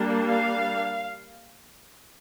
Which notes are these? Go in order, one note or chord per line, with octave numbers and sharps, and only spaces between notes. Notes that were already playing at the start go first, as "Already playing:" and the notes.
Already playing: G3 A#3 D4
F5